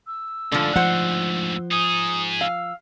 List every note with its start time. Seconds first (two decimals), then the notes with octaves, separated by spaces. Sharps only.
0.07 E6
0.52 D2 G#2 D3 F3
0.76 F3 C5 F#5
1.71 D#4 G#4 D#6
2.41 F5 E6